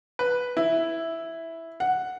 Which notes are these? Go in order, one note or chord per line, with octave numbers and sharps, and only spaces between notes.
B4
E4
F#5